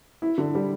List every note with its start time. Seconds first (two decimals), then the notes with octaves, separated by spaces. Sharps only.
0.22 E4
0.38 D3
0.55 G3